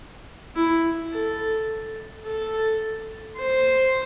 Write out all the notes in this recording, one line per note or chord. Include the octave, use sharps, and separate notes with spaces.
E4
A4
A4
C5